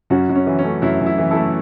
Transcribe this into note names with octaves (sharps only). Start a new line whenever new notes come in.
F#2 C#4 F#4
F#2
C#4
E3
C#4
A3
F#2 E4
F#2
E4
E3
E4 A4
A3